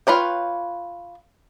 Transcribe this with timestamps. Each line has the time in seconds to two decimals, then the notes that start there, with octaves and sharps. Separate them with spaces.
0.07 F4 B4 C#5 G5